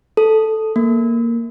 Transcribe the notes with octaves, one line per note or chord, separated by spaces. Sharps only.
A4
A#3